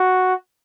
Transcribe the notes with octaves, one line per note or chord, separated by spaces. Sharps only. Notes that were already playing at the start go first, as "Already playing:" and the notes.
Already playing: F#4